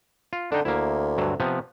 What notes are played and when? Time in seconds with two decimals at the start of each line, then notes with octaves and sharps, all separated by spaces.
0.33 F4
0.52 D3 D4 D#4 G5
0.65 D2 A#3 E4
1.18 G2 D3 F#3
1.40 C3 F3 B3